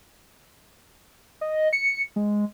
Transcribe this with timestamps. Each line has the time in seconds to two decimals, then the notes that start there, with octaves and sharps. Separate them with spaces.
1.41 D#5
1.73 C#7
2.16 G#3